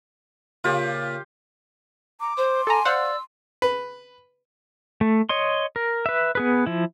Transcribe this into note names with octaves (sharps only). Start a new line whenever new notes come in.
A#2 C#3 F4 G4
A#5 D6
C5 C6
A4 G#5 A#5
C5 D5 F5 F#5 E6
B4
A3
C#5 D#5 C6
A#4
B4 E5
B3 G#4 B4
F3 E4